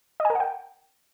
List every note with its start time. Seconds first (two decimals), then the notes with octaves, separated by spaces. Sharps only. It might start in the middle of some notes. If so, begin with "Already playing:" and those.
0.20 D#5
0.25 G#5
0.30 A#4
0.35 F#5
0.40 G5